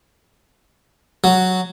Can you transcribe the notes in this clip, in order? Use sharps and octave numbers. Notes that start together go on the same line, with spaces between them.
F#3